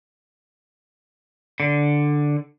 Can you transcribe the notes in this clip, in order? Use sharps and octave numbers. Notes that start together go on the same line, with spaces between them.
D3